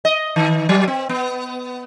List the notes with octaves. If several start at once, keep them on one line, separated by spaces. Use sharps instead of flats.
D#5
D#3
F#3
C4
B3